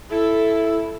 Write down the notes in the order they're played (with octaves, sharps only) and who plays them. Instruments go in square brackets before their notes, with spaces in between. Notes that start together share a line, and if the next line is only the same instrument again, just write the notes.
[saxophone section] E4 [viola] A4